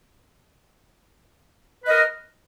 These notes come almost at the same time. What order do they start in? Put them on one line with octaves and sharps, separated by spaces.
B4 D#5 A#4